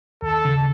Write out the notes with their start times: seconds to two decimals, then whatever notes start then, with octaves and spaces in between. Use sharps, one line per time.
0.22 D#2 A4
0.45 C#3